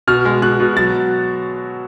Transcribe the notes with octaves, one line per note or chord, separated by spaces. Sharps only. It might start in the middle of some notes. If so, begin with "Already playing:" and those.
B2 F6
G#3
B2 F#6
B2
F#3 A6